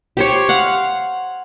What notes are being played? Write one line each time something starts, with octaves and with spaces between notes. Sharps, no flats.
G4 C5 C#5
F5 F#5